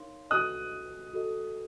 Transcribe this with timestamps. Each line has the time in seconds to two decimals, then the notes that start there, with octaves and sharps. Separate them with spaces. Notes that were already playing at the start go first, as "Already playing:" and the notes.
Already playing: D#4 A#4 C#5 F5 C6
0.30 F#4 A4 D#5 D#6 F#6
1.13 F#4 A4 D#5